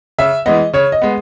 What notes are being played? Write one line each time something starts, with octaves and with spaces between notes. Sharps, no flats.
C#3 E5
E3 G#3 B3 D#5
C#3 C#5
D#5
G#3 B3